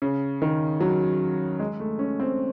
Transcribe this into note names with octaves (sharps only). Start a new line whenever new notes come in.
C#3
D#3
F#3
G#3
A3
C#4
C4